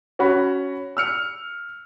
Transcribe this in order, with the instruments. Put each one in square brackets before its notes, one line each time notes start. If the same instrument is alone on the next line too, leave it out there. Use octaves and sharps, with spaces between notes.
[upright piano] C#4 F#4 B5
E6 F6 C#7